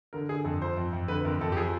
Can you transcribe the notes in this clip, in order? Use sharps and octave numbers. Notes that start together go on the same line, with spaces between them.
D3 A#4
D3 G#4
F2 A4
F3 C5
F2
F2
D3 B4
F2 A#4
F2 A4
G4
F3 G#4